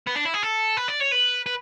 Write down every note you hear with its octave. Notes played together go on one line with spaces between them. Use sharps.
B3
D4
E4
G#4
A4
B4
D5
C#5
B4
B4